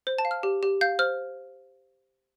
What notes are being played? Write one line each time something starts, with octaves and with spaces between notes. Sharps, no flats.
C5
A5
F5
F6
G4
G4
F5 G6
C5 F6